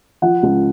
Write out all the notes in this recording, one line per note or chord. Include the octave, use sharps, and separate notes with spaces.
F3 F#5
C#2